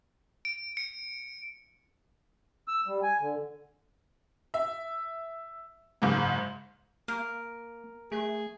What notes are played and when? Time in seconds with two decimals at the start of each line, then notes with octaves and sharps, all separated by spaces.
0.45 D7
0.77 C#7
2.68 E6
2.87 G3
3.03 G#5
3.21 D3
4.54 E5
6.02 F#1 G#2
7.08 A#3 A#4
8.12 A3 G#4